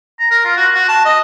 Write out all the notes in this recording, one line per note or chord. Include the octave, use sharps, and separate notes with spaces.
A#5
A#4
F4
F#4
F#4
A5
D#5